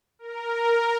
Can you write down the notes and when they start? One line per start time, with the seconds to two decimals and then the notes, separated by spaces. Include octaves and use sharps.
0.19 A#4